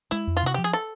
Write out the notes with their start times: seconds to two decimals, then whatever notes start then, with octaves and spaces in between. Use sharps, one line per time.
0.11 G#3 E4
0.27 F2
0.37 F4
0.43 C3 F#4
0.54 F3 G4
0.64 G#4
0.73 A4